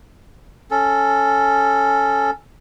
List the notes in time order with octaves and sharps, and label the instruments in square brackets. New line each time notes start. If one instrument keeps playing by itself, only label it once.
[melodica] C#4 A4